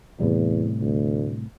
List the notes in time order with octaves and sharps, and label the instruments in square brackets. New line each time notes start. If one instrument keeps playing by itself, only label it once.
[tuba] E2 [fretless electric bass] A2 C3 G3
[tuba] D2